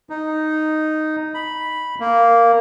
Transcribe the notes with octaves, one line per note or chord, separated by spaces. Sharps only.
D#4
B5
A#3